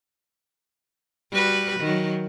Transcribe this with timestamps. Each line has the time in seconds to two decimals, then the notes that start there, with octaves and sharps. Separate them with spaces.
1.31 G3 F#4 B4
1.80 D#3 F#3